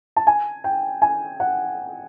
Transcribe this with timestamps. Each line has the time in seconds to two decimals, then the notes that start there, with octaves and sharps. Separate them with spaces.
0.16 A5
0.27 G#5
0.64 G5
1.02 G#5
1.40 F#5